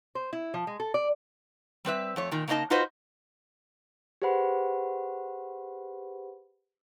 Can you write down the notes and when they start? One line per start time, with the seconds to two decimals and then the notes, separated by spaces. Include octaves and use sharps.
0.15 C5
0.33 E4
0.54 F3
0.67 G#3
0.80 A4
0.94 D5
1.85 G3 C4 B4 E5
2.16 F2 A3 C#5
2.31 A#2 D#3
2.48 C#3 A#3 D4 D#4 D#5 A5
2.70 D#4 F4 F#4 B4 C5 D#5
4.22 G4 G#4 B4 C5 F#5 B5